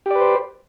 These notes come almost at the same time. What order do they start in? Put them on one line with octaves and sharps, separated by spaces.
G4 D5 B4 C5